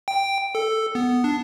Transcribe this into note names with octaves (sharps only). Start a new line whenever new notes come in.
G5
A4
B3
D4